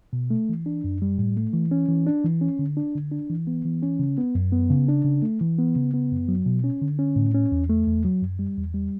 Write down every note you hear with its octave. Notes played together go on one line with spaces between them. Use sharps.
B2
A3
E3
D4
F#2
G3
A2
A3
E3
C#4
E3
D4
E3
C#4
D3
D4
D3
D4
E3
B3
E3
C#4
C#3
B3
F#2
B3
C#3
D4
C#3
A3
E3
B3
C#3
B3
F#2
F#3
B2
C#4
D3
C#4
A2
C#4
E2
A3
E2
F#3
F#2
G3
E2
G3